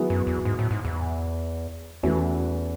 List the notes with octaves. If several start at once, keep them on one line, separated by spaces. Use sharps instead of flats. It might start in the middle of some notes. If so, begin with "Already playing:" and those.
Already playing: F#3 B3 E4 G#4
F#2
E2
G#2
A2
G#2
E2
E2 E3 A3 C#4 F#4